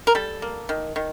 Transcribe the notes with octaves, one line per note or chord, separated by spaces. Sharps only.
A#4
G3 A4
A#3
D#3
D#3